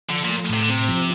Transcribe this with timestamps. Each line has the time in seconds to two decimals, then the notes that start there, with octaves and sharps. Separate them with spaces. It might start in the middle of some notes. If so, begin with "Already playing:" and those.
0.09 D3 F3
0.24 A#2 A3
0.49 A2 C3
0.62 D3
0.69 C3 C4
0.88 F3